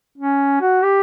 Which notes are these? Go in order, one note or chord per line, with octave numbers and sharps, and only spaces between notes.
C#4
F#4
G4